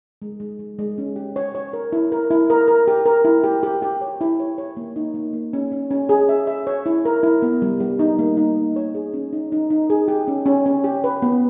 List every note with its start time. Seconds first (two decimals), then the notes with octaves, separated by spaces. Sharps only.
0.22 G#3
0.40 G#3
0.59 G#3
0.79 G#3
0.98 C#4
1.16 G4
1.36 C#5
1.55 C#5
1.73 A#4
1.92 E4
2.12 A#4
2.31 E4
2.50 A#4
2.68 A#4
2.88 G4
3.06 A#4
3.25 E4
3.44 G4
3.63 G4
3.82 G4
4.01 C#5
4.21 E4
4.40 C#5
4.58 C#5
4.77 A#3
4.96 D#4
5.14 A#3
5.33 A#3
5.53 C#4
5.72 C#4
5.91 C#4
6.09 G#4
6.29 E5
6.47 E5
6.67 C#5
6.86 E4
7.05 A#4
7.23 E4
7.42 B3
7.62 G3
7.80 G3
7.99 D#4
8.19 A#3
8.37 D#4
8.57 A#3
8.76 C#5
8.95 G#4
9.14 C#4
9.33 D#4
9.52 D#4
9.70 D#4
9.90 G#4
10.08 G4
10.28 C#4
10.46 C#4
10.66 C#4
10.84 G4
11.04 B4
11.22 B3